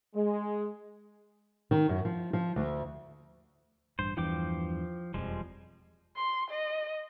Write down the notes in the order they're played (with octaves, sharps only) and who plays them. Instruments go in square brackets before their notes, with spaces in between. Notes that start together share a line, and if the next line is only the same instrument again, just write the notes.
[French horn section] G#3
[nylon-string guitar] D#3
F#2
F3
F3
D2
[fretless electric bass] A1 G2 [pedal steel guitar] C5
[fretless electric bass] E2 G2 E3 [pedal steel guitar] F3 G5 D6
[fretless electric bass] E1 F2 [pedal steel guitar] F3 G3 G#3
[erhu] C6
D#5